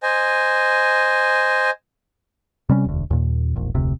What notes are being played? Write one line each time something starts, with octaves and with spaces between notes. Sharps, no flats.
C5 D#5 G#5
C3 G3 C#4
E1 D2
D#2 A#2
E1 A#1
F1 D2 C3